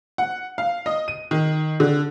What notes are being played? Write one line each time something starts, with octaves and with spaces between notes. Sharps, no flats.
F#5
F5
D#5
D#7
D#3
D3